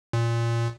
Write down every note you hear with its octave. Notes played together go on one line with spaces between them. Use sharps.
A#2